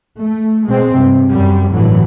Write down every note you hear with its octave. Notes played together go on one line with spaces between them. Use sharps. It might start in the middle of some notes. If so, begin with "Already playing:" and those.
A3
B2 G#3 C4
G2 C3
F#2 G3
G1 A2 D3 E3 F#3